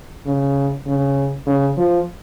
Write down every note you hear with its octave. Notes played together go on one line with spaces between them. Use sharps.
C#3
C#3
C#3
F3